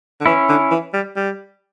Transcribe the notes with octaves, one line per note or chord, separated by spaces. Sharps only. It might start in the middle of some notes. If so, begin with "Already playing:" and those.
D3
E3 C#4 E4
D3
E3
G3
G3